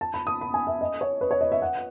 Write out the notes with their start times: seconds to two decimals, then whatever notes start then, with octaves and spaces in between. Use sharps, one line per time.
0.01 A5
0.14 B5
0.27 D#6
0.41 B5
0.54 G#5
0.67 E5
0.81 D#5
1.01 C#5
1.21 B4
1.31 C#5
1.41 D#5
1.52 E5
1.62 F#5